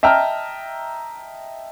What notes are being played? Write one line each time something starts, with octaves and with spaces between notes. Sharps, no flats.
D#5 E5 G5 A5 A#5 F6